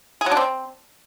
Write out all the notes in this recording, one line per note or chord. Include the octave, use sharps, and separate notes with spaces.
G#4
F#3
D4
C4